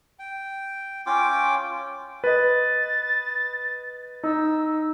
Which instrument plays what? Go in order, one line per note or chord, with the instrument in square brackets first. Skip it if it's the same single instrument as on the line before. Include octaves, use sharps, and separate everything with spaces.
[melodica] G5
C#4 F4 G5 D6
[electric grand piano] B4 D#5 [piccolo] A6
[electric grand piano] D#4 [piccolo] E6